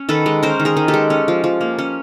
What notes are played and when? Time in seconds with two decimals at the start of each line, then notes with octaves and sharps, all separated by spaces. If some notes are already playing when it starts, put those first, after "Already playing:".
Already playing: C#4
0.09 D#3 A4 B4
0.26 G#3
0.43 C#4 A#4 C5
0.60 D#3
0.65 G#4 A#4
0.77 D#3
0.88 G4 A4
0.94 G#3
1.10 C#4
1.28 F3
1.44 F3
1.61 A#3
1.79 C#4